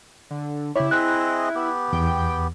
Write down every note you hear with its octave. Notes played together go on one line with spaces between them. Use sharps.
D3
C#3 E4 G4 C#5
C4 G#4 D#5 F#6
B3 G4
E2 G5